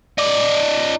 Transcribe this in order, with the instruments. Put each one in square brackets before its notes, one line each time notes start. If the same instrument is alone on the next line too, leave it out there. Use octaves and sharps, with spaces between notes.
[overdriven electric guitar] D#4 D5